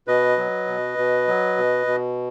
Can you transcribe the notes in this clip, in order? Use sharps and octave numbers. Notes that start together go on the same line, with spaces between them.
B2 B4 D#5
F#3
B2
B2
F#3
B2
B2